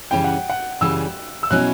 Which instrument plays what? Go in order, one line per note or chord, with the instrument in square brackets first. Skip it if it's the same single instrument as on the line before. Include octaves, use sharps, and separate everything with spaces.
[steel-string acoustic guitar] F#2 C#3 E3 G3 C#4 [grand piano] G5
[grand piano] F#5
F#5
[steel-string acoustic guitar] F#2 C#3 E3 G3 C#4 [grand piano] E6
[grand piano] E6
[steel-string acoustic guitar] B2 F#3 C#4 E4 [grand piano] F#6